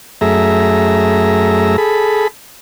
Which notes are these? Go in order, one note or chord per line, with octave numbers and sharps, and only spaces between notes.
F#2 A3 G#4 E5 A#5
G#4 A4 B5